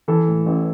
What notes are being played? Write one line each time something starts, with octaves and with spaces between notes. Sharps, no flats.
E3 A4
A2
A1